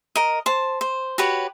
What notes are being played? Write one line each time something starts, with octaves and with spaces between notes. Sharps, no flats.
A#4 D#5
C5 A5
C5
F#4 G4 B4 C#5